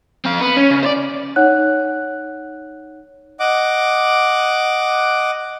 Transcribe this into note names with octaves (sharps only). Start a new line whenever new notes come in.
C4 F5
B3
C#4
C#3
C5 D5
D#4 C#5 F#5 F#6
D#5 F#5 D6